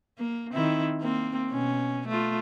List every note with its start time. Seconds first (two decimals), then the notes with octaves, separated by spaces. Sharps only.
0.19 A#3
0.52 D#3 C4 E4
1.01 A#3 C4
1.50 B2 C#4
2.08 A3 F4